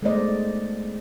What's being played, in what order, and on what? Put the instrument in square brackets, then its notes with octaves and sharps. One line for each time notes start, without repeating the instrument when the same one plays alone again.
[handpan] G#3 A3 B3 C5 D5 D#5